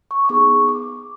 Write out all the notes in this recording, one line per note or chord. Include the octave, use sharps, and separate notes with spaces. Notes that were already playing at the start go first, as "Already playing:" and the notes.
C#6
D6
B3 D#4 G#4 C#6
D6